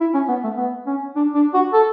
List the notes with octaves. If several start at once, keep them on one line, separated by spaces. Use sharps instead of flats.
E4
C#4
B3
A3
B3
C#4
D4
D4
F#4
A4